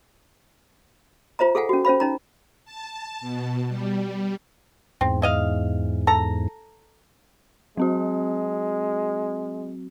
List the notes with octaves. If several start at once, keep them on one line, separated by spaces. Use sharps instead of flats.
F4 C5 E5 A#5
G#4 A4 F5 F#5 G#5
C#4 F#4
C#4 C5 F5 B5
C#4 D#4 A#5
A5
B2
G3
E2 G#2 C4
E4 D#5 F5
A4 A#5
F#3 G#3 C4 F#4